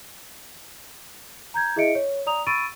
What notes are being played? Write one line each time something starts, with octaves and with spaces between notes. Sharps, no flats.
A#5 G6 G#6
E4 G#4 D#5 E5 C#7 D7
C#5
D5 A#5 D#6 F7
B5 C#6 E6 A6 D7 D#7